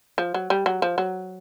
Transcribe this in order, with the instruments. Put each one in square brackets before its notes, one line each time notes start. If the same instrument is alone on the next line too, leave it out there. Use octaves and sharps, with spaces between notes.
[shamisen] F3
F#3
G3
F#3
F3
F#3